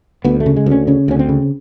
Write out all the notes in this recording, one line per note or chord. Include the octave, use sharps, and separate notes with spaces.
D2 B3
A3
C#3
G#3
D2 C#4
C#3 C#4
D2 C#4
C4
C#3